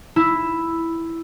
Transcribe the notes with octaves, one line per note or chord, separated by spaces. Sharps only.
E4